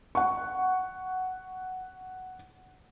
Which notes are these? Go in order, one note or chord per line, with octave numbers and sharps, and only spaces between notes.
F#5 C#6